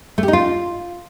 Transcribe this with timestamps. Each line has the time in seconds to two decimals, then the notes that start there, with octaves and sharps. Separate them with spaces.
0.18 A3
0.23 G4
0.28 D#4
0.33 F4